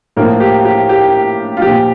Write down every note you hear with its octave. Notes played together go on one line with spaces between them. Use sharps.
A2 F3 A#3
G4
G4
G4
F4
A#2 F3 G4